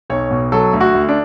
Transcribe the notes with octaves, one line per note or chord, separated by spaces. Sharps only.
B1 C#5
B2
F#3 A4
D2
F#4
D2
D4